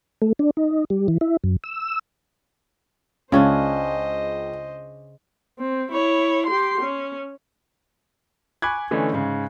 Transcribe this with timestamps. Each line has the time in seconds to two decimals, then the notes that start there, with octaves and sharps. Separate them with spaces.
0.22 A3
0.39 D4
0.57 D#4
0.90 G3
1.08 E3
1.21 E4
1.44 F#2
1.64 E6
3.32 C#2 C#3 C#4 D4 C5 D#5
5.59 C4
5.92 E4 C#5
6.47 G4 C6
6.82 C#4
8.62 G#5 B5 C#6 D6 F#6 G#6
8.91 D3 E3 A3 C#4 D#4
9.13 G#2 C#3